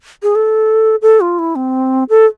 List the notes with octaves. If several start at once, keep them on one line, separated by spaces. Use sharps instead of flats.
G#4
A4
A4
F4
E4
C4
A4